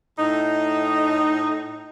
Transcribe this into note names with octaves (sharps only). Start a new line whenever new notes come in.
A2 D#4